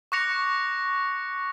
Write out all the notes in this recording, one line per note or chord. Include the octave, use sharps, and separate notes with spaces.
C#6 D6 F#6 A#6 C#7 F7